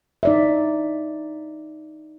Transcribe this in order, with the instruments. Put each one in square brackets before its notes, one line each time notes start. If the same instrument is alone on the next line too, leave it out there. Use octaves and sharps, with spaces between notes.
[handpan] D#4 D5 E5